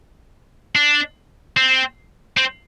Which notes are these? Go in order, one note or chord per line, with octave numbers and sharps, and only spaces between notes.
D4
C4
C4